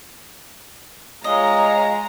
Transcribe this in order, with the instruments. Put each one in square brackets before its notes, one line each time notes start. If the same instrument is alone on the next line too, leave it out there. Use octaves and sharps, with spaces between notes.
[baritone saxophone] G#3 [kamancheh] F4 C#5 [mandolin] D#5 [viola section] A#5